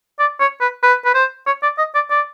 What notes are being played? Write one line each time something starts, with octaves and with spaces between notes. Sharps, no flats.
D5
C#5
B4
B4
B4
C5
C#5
D5
D#5
D5
D5